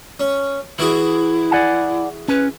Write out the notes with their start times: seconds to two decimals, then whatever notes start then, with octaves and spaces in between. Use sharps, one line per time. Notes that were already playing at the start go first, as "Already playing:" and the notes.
0.20 C#4
0.79 E3 E4 F#4 G#4
1.51 D5 F#5 G#5
2.28 C#4 B4